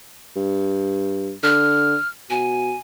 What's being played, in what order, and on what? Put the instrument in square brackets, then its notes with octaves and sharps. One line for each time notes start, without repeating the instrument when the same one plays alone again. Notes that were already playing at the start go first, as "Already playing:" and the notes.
[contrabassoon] G2
[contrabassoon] D3 [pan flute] F6
[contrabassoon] B2 [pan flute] G#5